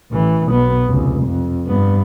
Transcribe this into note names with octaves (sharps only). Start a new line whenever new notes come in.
A1 E3
B1 B3
F1 C#2
F2
G2 B3